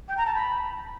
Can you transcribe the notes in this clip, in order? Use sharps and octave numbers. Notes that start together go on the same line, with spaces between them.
G5
A#5
A5
B5